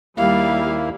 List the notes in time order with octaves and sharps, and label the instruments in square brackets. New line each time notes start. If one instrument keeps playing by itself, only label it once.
[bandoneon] D#2 A#3 E4 [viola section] G3 [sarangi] F5